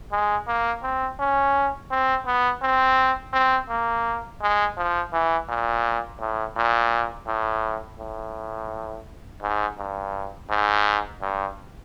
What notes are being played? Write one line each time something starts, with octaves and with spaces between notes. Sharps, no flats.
G#3
A#3
C4
C#4
C4
B3
C4
C4
A#3
G#3
F3
E3
A#2
A2
A#2
A2
A2
G#2
G2
G#2
G2